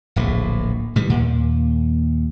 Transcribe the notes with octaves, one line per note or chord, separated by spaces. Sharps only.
D1 A#1 A2
A2 D#3 E3 G3
D#2 A#2